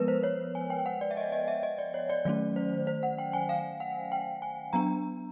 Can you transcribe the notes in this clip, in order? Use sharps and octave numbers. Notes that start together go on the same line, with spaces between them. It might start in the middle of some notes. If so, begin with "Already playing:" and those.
Already playing: F3 G#3 B3 A#4 B4
C5
C#5
G#5
G5
F#5
D5
E5
D#5
D#5
E5
D#5
D5
C#5
D5
D#3 F#3 A3 C#4 D5
C5
C5
F#5
G5
G#5
F5
F#5
G5
G#5
F#3 B3 D4 A#5